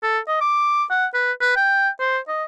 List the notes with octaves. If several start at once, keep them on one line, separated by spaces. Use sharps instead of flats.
A4
D#5
D6
F#5
B4
B4
G5
C5
D#5